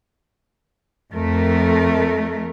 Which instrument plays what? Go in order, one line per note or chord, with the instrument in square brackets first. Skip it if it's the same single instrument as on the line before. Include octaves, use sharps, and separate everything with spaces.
[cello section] F2 A3 A#4